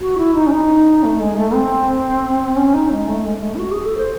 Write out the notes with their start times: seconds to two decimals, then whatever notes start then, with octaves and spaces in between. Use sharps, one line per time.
0.01 F#4
0.18 E4
0.34 D#4
0.47 C#4
0.52 D#4
1.03 A3
1.20 G#3
1.37 A3
1.54 C4
2.56 C#4
2.74 D#4
2.91 G#3
3.07 A3
3.25 G#3
3.42 A3
3.55 E4
3.59 F#4
3.72 G#4
3.85 A4
3.97 C5